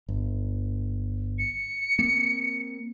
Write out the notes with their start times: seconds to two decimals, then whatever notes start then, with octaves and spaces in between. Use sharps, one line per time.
0.09 G1
1.38 C#7
1.99 A#3 C4